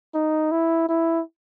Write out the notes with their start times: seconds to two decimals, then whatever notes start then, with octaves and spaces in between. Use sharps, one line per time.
0.15 D#4
0.52 E4
0.89 E4